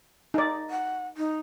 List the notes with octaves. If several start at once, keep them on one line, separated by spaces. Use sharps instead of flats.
D#4 D5
F#5
D#4